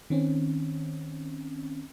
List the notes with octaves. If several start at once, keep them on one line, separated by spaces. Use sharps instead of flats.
D#3 C4 C#4